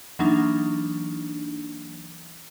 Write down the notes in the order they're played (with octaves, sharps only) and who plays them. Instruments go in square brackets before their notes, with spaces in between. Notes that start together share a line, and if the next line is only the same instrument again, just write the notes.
[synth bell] E3 F#3 A#3 D4 D#4